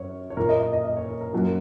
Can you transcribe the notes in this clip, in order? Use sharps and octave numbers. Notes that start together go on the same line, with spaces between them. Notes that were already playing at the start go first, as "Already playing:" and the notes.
Already playing: F#2 C#5
C#5
A#2 A#3 A#4
D#5
D#5
D#5
D#5
C#5
A#4
A#4
F#2 F#3 A#3